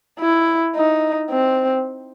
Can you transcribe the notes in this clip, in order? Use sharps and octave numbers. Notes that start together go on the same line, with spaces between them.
E4
D#4
C4